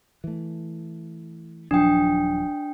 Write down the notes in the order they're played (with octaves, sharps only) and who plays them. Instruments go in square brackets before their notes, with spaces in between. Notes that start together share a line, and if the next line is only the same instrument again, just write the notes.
[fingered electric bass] E3 A3
[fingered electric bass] D#1 F3 F#3 [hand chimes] D4 G5